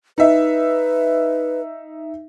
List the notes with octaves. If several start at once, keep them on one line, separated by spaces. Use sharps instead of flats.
D#4 B4 E5